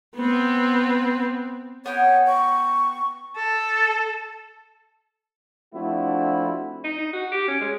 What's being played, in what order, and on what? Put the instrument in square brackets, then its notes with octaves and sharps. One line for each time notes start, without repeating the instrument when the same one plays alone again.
[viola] B3 C4
[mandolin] B3 G5 [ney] C#5
[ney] C#6
[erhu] A4
[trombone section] F3 A3 C4 D4 E4 F#4
[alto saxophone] D#4
D#4
F#4
G4
C#4
G#3